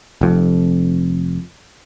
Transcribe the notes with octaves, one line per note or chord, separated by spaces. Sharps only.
F1 F2